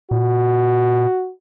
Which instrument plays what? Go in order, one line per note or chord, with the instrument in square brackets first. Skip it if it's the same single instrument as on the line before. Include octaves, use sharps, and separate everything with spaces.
[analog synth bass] A#2 [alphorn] F#4